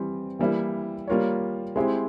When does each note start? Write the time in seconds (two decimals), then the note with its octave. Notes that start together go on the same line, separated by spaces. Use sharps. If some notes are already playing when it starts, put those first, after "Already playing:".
Already playing: E3 G3 C4
0.39 E3 G3 A#3 E4
1.08 G3 A#3 F4 A#4 C#5
1.76 G#3 C4 E4 G4 C5